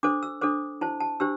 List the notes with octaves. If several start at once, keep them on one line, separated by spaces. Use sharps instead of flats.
D4 A4 C5 D6
E6
D4 A4 C5 D6
E4 C5 A5
A5
D4 G4 C5 E6